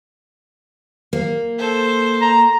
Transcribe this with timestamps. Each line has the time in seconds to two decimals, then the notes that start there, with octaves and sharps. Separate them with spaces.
1.13 A#3
1.58 A4 C5
2.21 A#5